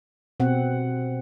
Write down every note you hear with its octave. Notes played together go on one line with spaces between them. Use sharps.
B2 C4 F#5